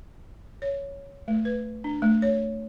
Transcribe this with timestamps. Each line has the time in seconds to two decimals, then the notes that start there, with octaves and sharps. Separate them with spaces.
0.62 C#5
1.28 A3
1.45 B4
1.84 D4
2.02 A3
2.22 C#5